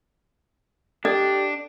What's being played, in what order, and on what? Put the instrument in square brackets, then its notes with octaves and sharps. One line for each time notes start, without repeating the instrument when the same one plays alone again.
[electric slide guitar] D4 [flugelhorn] G4 [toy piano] A4 D5 D#5